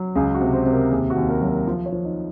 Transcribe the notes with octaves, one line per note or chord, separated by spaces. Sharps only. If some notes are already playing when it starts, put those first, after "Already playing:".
Already playing: F#3
C#2 G#4
F#4
C3
C5
C3
A#4
D#2 G#4
F#4
D#2
A#4
F#3
A#4
F3 C5
C#5
F3
D#4